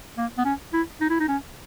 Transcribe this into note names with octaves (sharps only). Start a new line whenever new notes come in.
A#3
B3
C#4
E4
D#4
E4
D#4
C#4